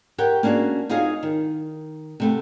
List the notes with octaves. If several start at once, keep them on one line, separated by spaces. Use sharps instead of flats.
G4 A#4 C#5 F#5 G5
A#3 C#4 D4 F#4 G#4
D#4 F4 F#4 G#4 C#5 F5
D#3
C3 A3 B3